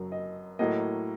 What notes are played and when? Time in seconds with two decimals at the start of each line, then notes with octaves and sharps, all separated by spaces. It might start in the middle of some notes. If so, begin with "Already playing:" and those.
Already playing: F#1 F#2 F#3
0.12 D#5
0.59 A2 F#3 A#3 D#5